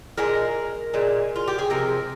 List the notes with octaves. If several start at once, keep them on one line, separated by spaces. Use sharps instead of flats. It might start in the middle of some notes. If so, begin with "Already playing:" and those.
A#2 G#3 A#4
A#2 G#3
F4
G4
G#4
C3 F3 G#3 A#4